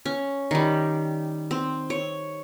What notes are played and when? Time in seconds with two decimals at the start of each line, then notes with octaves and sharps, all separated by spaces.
0.06 C#4
0.51 D#3 G3
1.51 C4
1.90 C#5